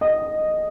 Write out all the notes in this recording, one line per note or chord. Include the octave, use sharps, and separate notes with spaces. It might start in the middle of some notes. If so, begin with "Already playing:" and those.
D#5